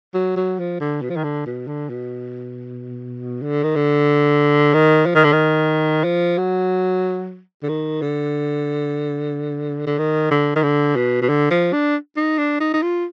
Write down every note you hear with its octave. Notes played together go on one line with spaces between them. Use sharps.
F#3
F#3
F3
D3
B2
F3
D#3
D3
B2
D3
B2
D3
D#3
D3
D#3
F3
D#3
D3
D#3
F3
F#3
D3
D#3
D3
D3
D#3
D3
D#3
D3
B2
B2
D3
F3
D4
D#4
D4
D#4
D#4
F4